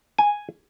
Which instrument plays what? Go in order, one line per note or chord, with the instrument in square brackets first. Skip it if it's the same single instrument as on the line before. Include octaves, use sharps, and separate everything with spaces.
[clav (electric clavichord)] G#5